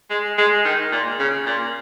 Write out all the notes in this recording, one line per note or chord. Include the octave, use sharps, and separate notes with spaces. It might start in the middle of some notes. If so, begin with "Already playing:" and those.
G#3
G#3
D#3
A#2
C#3
A#2